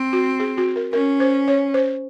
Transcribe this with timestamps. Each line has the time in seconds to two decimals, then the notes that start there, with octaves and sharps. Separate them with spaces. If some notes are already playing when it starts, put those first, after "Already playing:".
Already playing: C4
0.13 F#4
0.40 G#4
0.57 F#4
0.76 A#4
0.93 C#4 A#4
1.20 C5
1.48 C#5
1.74 C5